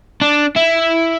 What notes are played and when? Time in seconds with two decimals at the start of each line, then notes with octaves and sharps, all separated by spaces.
0.21 D4
0.56 E4